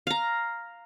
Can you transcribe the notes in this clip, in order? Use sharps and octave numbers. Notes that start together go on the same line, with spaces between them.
F5 A#5